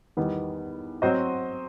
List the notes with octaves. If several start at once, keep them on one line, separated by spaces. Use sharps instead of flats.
E2 D#3 G3 B3
F#3 C4 F#4 C5 D#5